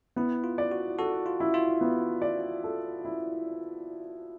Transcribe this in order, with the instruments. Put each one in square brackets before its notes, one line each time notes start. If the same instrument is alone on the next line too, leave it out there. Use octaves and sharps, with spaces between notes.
[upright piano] B3 [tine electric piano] E4
[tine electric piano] F4
[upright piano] D5
[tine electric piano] F#4
[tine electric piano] F#4 [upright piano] A4
[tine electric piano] F4
[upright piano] E4
[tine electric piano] F4
[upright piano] B3
D5
A4
E4